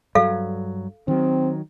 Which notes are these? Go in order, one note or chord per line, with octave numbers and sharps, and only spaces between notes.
G2 F#3 A4 F5
D#3 F#3 C4